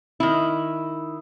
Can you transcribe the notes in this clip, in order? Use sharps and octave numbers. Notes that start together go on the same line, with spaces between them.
D#3 E4